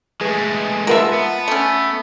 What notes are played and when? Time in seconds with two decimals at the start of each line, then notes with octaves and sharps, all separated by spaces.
0.21 G#3 A3 G#4 B4
0.87 F4 A#4 B4 E5 F#5 A5
1.13 B3
1.48 A3 C#4 D7